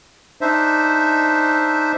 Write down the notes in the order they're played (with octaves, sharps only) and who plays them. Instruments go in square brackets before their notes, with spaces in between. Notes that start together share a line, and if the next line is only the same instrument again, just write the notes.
[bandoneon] D4 D#4 C5 E5